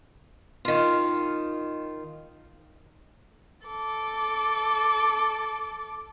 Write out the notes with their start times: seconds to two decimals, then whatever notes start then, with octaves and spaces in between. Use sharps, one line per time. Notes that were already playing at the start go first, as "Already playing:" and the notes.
0.65 D#3 F4
3.67 A4 D6